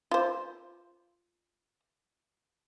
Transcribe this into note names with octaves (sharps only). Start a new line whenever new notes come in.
F4 C5